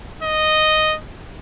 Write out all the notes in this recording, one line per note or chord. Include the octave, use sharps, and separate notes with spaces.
D#5